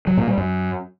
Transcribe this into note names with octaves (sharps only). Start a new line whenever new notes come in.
F#3
A#2
G3
F#2